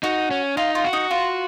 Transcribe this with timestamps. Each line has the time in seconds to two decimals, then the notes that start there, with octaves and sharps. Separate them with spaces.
0.03 D#4 F#4
0.31 C#4
0.57 D#4 F4
0.75 F4
0.84 F#4
0.93 D#4
1.11 F4